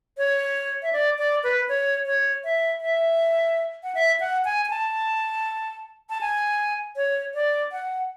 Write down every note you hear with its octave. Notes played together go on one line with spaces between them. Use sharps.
C#5
E5
D5
D5
B4
C#5
C#5
E5
E5
F#5
E5
F#5
G#5
G#5
A5
A5
G#5
C#5
D5
F#5